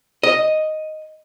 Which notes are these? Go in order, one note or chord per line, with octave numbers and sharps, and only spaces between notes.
D#5